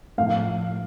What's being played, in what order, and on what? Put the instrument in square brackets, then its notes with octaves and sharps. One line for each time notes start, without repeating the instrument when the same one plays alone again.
[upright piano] A2 F3 F5